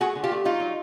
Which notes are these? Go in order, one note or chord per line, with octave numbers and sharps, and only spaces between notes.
A3 F#4 G#4
D3
F4 G4
A3
F#3 D#4 F4
F#3